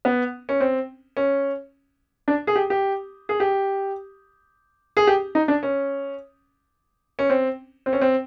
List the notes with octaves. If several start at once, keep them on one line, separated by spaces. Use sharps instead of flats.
B3
C#4
C4
C#4
D4
G#4
G4
G4
G#4
G4
G#4
G4
D#4
D4
C#4
C#4
C4
C4
C#4
C4